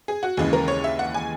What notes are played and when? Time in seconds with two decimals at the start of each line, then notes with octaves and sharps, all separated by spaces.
0.08 G#4
0.23 F#4
0.37 D#2 C#3 E3 G#3 G#4
0.53 A#4
0.68 C#5
0.84 E5
0.99 F#5
1.14 G#5